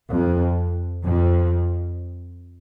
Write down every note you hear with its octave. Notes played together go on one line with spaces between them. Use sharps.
F2
F2